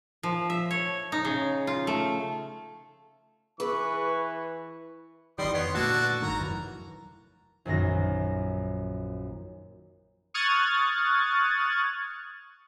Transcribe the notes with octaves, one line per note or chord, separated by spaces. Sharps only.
F3
E5
C#5
D#4
C#3
F4
A3
E3 G#4 B4 C#6 D6
F2 D#3 E3 G3 D#5 C6
B3 C#5 C6
A#2 D3 A3 F#4 A5 E6
G#1 G2 D#3 A#4 A#5
F1 F#2 E3
A#1 F#2 D#3 A#6
C#6 D#6 F6 F#6 G#6 A6